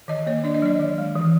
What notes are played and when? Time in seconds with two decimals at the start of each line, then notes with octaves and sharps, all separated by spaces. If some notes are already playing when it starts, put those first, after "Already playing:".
0.08 D#3 D#5
0.26 A#3 C#5
0.44 D4 D5
0.54 D#5
0.62 F#3 D5
0.80 D#3
0.98 G#3
1.15 E3